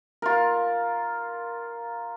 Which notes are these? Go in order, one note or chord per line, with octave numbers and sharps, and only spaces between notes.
F4 A#4